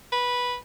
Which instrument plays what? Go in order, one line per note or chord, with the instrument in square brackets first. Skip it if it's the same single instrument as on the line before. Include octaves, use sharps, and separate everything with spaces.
[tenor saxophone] B4